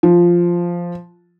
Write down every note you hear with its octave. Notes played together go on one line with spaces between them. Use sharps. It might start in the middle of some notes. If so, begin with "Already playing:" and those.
F3